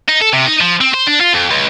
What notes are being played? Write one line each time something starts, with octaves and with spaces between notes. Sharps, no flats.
D#4
A4
C3
D#4
F3
C4
C5
D4
F4
F2
C#2